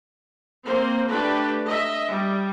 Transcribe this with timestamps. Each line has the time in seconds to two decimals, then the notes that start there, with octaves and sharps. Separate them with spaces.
0.65 A#3 C4 C5
1.09 A3 D4 G4 B4
1.68 D#5 E5
2.09 G3